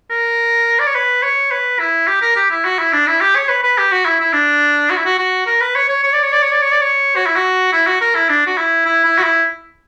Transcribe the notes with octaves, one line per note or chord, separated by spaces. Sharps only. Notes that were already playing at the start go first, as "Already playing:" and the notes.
A#4
D5
C#5
B4
C#5
B4
E4
G4
A#4
G4
E4
F#4
E4
D4
E4
G4
C#5
B4
B4
G4
F#4
E4
E4
D4
F#4
E4
F#4
F#4
A#4
B4
C#5
C#5
C#5
D5
C#5
D5
C#5
D5
C#5
D5
C#5
F#4
E4
F#4
E4
F#4
A#4
E4
D4
F#4
E4
E4
E4
F#4
E4